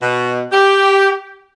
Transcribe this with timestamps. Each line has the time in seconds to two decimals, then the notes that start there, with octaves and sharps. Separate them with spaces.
0.01 B2
0.52 G4